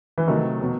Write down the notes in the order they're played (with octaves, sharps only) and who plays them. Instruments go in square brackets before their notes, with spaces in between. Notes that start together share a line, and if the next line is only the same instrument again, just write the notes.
[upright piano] E3
[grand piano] C3 F#3 A3 [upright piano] D#3
[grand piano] B2 F#3 B3